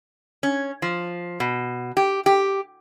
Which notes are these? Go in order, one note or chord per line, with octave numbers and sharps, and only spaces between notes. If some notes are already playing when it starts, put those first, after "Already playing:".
C#4
F3
B2
G4
G4